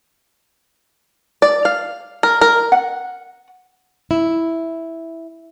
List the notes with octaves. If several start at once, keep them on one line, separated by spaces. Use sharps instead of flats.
D5
F5
A#4
A#4
F#5
E4